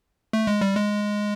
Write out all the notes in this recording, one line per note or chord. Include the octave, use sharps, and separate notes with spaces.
A3
G#3
G3
G#3